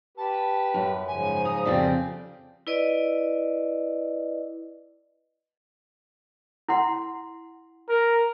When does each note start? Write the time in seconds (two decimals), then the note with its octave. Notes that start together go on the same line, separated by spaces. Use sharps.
0.17 G4 B4 A5
0.74 F#2
1.08 G#2 C#3 F3 G#5
1.45 A#5 D#6
1.65 F2 C#3 C4 F4 G4 D5
2.67 E4 B4 D5 D#5
6.69 E4 F#5 C6
7.89 A#4